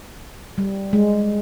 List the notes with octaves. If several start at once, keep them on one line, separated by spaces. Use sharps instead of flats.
G3
G#3